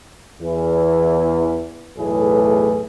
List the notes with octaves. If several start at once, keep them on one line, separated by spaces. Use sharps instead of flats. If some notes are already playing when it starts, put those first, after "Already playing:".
E2 E3
B1 E2 A2 A3 G#4 B4